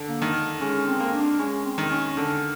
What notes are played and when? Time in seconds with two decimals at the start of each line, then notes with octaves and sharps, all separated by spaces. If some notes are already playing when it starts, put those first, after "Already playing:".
Already playing: D3
0.09 A#3
0.22 D#3
0.60 G#3 C#4
0.87 C4
1.00 A#3
1.13 D4
1.39 G#3 C#4
1.65 C4
1.78 D#3
1.91 C#4
2.17 D3